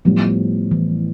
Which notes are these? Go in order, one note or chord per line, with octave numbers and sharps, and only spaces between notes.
A2 F3 G3 B3
E3